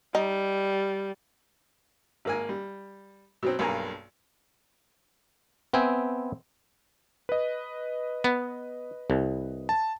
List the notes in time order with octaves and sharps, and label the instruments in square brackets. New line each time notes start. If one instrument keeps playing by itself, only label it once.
[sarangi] G3 [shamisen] D#4
[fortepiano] G#1 A#3 G#5
G3
B2 F#3 C4
B1 G2 A#3 G#5 A#5
[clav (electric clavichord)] B3 C4 E5 G5 G#5
[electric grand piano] B4 D#5
[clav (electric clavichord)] B3
C2
[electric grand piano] A5